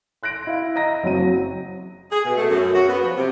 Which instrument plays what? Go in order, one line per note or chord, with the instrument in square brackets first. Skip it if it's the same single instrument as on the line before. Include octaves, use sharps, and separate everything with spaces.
[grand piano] C6 F#6 A#6 D7
E4 F5
D#5 A#5 A#6
F#1 F#3 C4 F#4 D#7
[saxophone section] G#4
B2
A3
F#2
F#4
B3
F3
C3